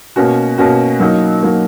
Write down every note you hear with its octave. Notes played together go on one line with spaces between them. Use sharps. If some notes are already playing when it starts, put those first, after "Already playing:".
B2 A#3 C#4 F#4
B2 A#3 C#4 F#4
F#3 A#3 D#4 F#4
F#3 A#3 D#4 F#4